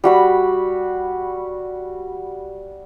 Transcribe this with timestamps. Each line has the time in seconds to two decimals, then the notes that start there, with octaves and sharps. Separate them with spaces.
0.04 G3 F#4 B5